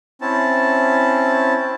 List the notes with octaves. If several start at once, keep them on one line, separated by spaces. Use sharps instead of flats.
C4 C#4 E4 A5